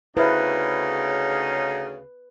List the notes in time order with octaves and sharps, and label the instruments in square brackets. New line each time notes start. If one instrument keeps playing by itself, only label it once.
[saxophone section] D2 C#3 [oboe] D#4 [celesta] E4 C5 E5 [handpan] B4